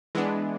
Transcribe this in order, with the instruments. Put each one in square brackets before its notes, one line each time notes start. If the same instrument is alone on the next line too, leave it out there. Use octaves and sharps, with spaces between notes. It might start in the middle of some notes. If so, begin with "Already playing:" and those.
[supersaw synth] E3 G#3 B3 D4